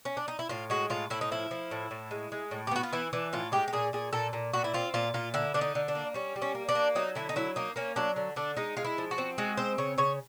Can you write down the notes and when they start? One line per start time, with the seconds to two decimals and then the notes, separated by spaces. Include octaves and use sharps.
0.05 C#4
0.17 D4
0.28 D#4
0.39 E4
0.49 A2 F4
0.70 G#3 F#4
0.90 A2 F4
1.10 A2 E4
1.21 D#4
1.31 F3 E4
1.51 F3
1.71 A2
1.91 A2
2.11 G#3
2.32 G#3
2.51 A2
2.67 G4
2.71 B3 F#4
2.83 F4
2.93 E3 E4
3.13 E3 D4
3.33 A2 F4
3.52 G#3 G4
3.68 G4
3.73 A#2 G#4
3.93 A#2 G#4
4.13 A#2 A4
4.33 A#2
4.53 A#2 F#4
4.64 E4
4.74 C4 F4
4.94 A#2 F4
5.14 A#2 F4
5.34 D3 E4
5.54 D3 D4
5.61 D#4
5.75 D3
5.88 D4
5.95 A#3
6.14 G3 C#4
6.36 G3
6.42 C#4
6.55 A#3
6.69 D4
6.75 A#3
6.95 F#3 D#4
7.15 D3 E4
7.29 D#4
7.36 F#3 E4
7.56 A#3 D#4
7.76 A#3 C#4
7.96 F#3 D4
8.16 D3
8.36 D3 D4
8.57 G#3 D#4
8.77 G#3 F4
8.84 E4
8.98 F3
9.11 F#4
9.18 C4
9.38 G#3 F#4
9.57 C4 C5
9.78 C#3 C#5
9.98 C#3 C#5